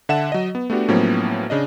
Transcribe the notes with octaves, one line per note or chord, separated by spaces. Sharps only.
D3 E5 F#5 A5 E7
F#3 D#5
B3
A3 B3 D4 F#4 G4
A2 F3 F#3 A#3 B3 C#4
C#3 D4 D#5